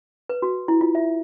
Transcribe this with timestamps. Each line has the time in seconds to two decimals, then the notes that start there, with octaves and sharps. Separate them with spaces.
0.29 B4
0.42 F#4
0.68 E4
0.81 F4
0.95 E5